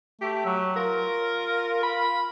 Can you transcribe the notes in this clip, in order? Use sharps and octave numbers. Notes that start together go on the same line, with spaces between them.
A3 G4
F#3
F4 A#4
B5